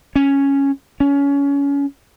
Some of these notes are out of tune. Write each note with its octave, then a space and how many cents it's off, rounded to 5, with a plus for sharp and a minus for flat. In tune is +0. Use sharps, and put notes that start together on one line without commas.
C#4 +0
C#4 +25